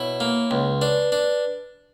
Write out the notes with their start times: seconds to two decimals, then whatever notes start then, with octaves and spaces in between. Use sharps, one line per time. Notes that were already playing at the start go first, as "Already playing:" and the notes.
Already playing: B2 E4 C#5
0.20 A#3
0.51 C#2
0.81 D4 B4
1.12 D4